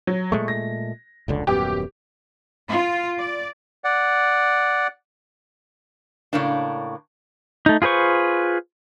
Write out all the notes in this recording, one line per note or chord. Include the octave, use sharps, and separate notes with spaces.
F#3
A#2 G#3 A3 C#6
A#6
F1 C#2 D3
D#1 F#2 B3 G4 D6
F4
D5
D5 F#5
A2 C#3 A#3 D4
A3 D#4
F4 G#4 B4 C5 C#6